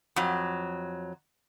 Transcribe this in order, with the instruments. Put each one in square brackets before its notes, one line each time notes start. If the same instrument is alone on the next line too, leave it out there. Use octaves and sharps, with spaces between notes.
[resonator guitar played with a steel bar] F2 F#3